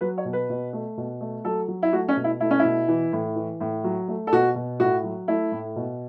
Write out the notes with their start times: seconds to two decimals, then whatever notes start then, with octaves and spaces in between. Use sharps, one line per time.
0.01 F#3 B4
0.18 C#5
0.25 B2
0.33 B4
0.50 B2
0.73 A3
0.97 B2
1.21 A3
1.45 F#3 A4
1.68 F#3
1.83 E4
1.93 A3 F#4
2.08 C#4
2.17 B2
2.24 E4
2.40 A3 E4
2.51 C#4
2.59 E4
2.65 B2
2.88 E3
3.13 A2
3.36 E3
3.61 A2
3.84 F#3
4.08 A3
4.27 A4
4.33 B2 F#4
4.55 B2
4.80 A2 F#4
5.04 F#3
5.28 A3 E4
5.52 A2
5.76 B2